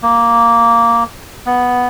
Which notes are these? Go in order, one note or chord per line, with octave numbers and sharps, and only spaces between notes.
A#3
B3